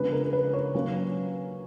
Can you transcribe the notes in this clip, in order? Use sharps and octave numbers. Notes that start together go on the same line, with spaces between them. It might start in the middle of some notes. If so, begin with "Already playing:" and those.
Already playing: C#3 F3 G#3 B3 D4 B4
A#4
B4
C#5
F#3 A#3 C#4